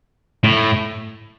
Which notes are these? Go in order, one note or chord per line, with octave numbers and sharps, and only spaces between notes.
A2